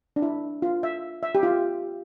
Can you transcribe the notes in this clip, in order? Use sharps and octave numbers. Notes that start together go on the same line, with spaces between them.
D4
E4
F4
E5
E5
G4
F4